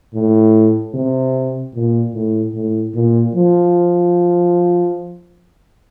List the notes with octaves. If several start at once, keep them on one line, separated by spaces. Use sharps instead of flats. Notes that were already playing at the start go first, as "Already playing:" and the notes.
A2
C3
A#2
A2
A2
A#2
F3